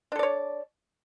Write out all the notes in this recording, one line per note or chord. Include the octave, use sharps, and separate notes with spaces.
D4 A4 C#5 D5